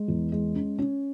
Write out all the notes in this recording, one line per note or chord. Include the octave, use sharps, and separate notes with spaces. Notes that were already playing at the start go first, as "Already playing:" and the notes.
Already playing: G#3
E2
G#3
C#4
C#4